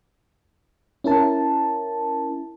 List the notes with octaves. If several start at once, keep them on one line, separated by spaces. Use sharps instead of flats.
C#4 E4 A#4 A5